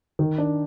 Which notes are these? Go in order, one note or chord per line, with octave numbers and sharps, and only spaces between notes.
D#3
D4